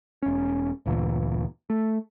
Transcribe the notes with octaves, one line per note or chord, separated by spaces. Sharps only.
E1 C#4
G1 D2 A#2 E3
A3